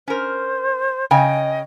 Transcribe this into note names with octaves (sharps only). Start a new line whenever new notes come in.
C#4 A#4 C5
C#3 D#5 G5 G#5